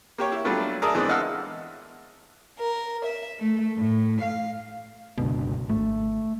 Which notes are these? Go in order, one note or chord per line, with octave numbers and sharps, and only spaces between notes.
A#3 G4 C#5
E4
F#3 G3 A3 B3 D4 F4
G#4 A#4 D5 E5 A5 D#6
E3 G#3 B3 C4 D4 E4
D#5 F5 F#5 A5 E6 F6
A#4
E5
A3
A2
F5
F#1 C#2 B2 D3
G#1 A3